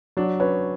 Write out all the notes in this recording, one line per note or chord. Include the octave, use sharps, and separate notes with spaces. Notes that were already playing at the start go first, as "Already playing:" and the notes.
F#3 D4
C#4 B4